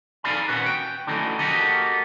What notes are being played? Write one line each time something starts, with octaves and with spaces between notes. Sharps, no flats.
D#4 A4 D5 F5 G#5 B5
D#2 A#2 B3 C#4 F#4 B4
G5
D3 E3 F#3 A3 C#4 D#4
A#3 F#4 G4 A4 D#5